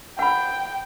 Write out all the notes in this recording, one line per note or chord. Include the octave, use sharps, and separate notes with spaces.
F#5 G5 B5